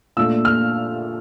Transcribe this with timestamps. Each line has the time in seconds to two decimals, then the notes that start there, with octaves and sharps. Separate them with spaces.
0.17 A#2 A3 D4 E6
0.45 F6